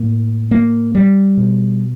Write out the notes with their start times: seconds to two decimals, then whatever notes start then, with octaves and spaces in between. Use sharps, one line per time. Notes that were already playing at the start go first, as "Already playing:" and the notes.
Already playing: A2 A#3
0.51 A#3
0.95 G3
1.37 B2